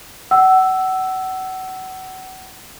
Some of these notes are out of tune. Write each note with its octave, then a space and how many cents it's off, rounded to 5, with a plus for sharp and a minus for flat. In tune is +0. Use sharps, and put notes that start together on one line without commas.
F#5 +30 E6 +0